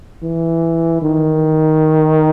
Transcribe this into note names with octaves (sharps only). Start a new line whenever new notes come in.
E3
D#3